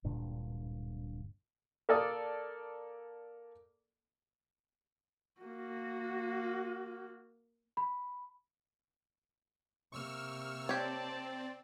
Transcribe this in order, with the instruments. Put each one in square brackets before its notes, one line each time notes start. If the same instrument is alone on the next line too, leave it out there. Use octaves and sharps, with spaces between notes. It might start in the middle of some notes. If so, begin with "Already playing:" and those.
[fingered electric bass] D1 G2 A#2 D3
[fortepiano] A#3 A4 D5 D#6
[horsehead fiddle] A#3 F#4
[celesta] B5
[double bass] C3 A#3 [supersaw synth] C#6 E6 F6
[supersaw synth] C4 [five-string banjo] G4 C#5 [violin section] D5 A5